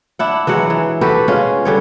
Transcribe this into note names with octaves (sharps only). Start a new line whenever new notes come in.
D4 E4 F#5
E3 F#3 G#3 F#5
E3
F#4 G4 A4 B4
G#3 C#4 F4
D3 G3 C#5